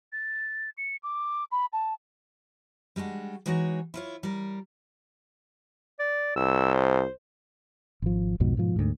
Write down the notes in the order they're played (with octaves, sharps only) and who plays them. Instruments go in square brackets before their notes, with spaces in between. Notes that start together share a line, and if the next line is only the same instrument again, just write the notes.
[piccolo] A6
C#7
D6
B5
A5
[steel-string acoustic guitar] G3 G#3 D4 F#4
E3 G#3 D#4 F#4 G#4 C#5
E4 F4 C#5
G3 A#4
[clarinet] D5
[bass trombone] C2 [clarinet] E6
[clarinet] C5
[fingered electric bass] G#1 F3
B1 F2 G#2 B2
G#2 B2 F3
D2 G#2